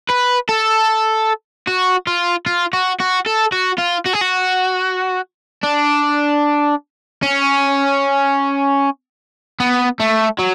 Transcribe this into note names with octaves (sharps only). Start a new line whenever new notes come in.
B4
A4
F#4
F4
F4
F#4
F#4
A4
F#4
F4
F#4
G#4
F#4
D4
C#4
B3
A3
F#3